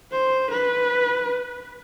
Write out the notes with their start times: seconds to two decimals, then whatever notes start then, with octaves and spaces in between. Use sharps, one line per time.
0.12 C5
0.51 B4